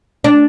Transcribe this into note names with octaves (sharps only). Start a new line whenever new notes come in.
D4